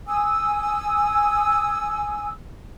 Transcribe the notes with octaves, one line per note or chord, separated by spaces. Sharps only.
G#5 D#6 E6